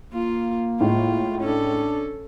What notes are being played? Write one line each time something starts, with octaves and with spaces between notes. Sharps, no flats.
A#3 F4
A2 G#3 F4
C#4 D4 A4